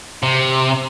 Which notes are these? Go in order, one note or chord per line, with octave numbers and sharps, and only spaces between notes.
C3